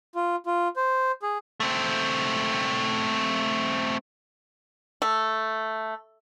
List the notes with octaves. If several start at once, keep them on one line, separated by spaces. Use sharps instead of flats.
F4
F4
C5
G#4
A3 C4
A3